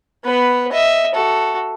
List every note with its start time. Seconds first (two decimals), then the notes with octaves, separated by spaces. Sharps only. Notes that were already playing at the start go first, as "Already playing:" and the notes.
0.24 B3 B4
0.72 D#5 E5
1.15 F#4 A4